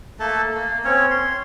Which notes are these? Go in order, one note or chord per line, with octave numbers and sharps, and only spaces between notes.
A3 A#3 A4 A5
A#3
C4 C#4 C#5
C6